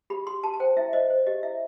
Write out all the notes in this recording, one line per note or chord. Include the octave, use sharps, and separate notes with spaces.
G4 B5
G4 C6
G4 A5
A5
C5 G5
E4 E5
C5 D#5
C5
G4 D#5
E4 E5